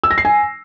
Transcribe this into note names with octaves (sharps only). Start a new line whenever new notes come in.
E6
A#6
C7
G#5